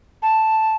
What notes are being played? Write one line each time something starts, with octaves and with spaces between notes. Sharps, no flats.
A5